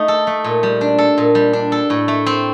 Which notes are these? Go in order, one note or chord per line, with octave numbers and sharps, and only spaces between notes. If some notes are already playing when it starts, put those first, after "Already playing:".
Already playing: A3 D#4
A4
A3
A#2
G3
D4
A4
A#2
G3
D4
A4
A2
A3
C4